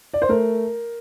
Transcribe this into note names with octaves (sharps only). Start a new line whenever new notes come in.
D5
C5
A3 A#4